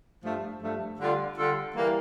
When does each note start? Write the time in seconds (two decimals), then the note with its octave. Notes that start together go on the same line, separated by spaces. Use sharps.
0.22 G2 F3 A3
0.61 G2 F3 A3
1.00 D3 G3 D4 F4 A4
1.38 D3 G3 D4 F4 A4
1.76 E3 G3 A#3